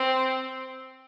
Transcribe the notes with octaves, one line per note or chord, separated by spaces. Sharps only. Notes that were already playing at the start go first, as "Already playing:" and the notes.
Already playing: C4